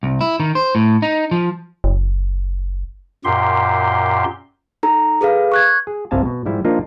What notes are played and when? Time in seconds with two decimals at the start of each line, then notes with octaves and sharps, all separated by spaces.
0.03 C2
0.21 E4
0.40 D#3
0.55 C5
0.75 A2
1.02 D#4
1.31 F3
1.84 F#1
3.25 F#2 A#2 G4 C6
4.83 D#4 A4 A#5
5.21 G#4 A4 B4 F5
5.52 C#6 F#6 G#6
5.87 G#4
6.11 G1 C2 C3 F5 G#5 A5
6.25 B2
6.46 G#2 F3 G3 E4
6.65 F3 A#3 D4 D#4 F4